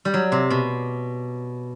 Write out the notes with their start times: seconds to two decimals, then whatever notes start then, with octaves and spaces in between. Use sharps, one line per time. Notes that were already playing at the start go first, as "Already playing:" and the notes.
0.05 G3
0.14 F#3
0.32 C3
0.50 B2